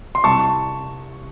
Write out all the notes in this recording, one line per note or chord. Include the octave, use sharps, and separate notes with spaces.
C6
C2 A5 C#6